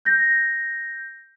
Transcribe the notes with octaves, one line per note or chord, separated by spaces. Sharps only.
G6 A#6